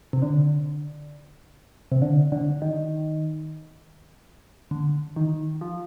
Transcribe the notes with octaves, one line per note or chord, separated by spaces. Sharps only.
C3
D3
C3
D3
D3
D#3
D3
D#3
F3